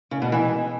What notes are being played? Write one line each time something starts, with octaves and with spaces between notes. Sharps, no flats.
C#3
B2
E3
G#3